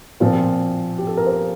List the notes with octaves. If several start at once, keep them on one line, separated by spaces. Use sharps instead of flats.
A#2 F3 C4 F4
G4
A4
A#4
C5